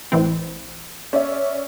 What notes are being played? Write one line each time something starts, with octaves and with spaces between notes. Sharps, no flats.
A1 E3 C4
C#4 D5 E5